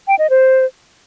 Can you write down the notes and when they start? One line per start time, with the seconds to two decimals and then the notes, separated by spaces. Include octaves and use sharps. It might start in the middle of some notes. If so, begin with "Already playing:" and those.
0.08 G5
0.19 D#5
0.30 C5